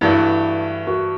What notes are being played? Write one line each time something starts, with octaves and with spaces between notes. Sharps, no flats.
G2 E3 A3 D4 E4 F#4
F#4